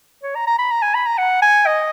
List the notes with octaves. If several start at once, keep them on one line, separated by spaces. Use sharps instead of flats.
C#5
A#5
A#5
B5
A#5
G#5
B5
A#5
F#5
G#5
D#5